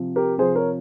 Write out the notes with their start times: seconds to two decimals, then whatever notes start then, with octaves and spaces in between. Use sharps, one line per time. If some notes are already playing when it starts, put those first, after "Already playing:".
Already playing: C3 F3
0.16 G4 A#4
0.38 C3 F3 G#4 C5
0.56 A#4 C#5